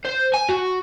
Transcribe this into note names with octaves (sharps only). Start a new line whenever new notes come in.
C5
G#5
F#4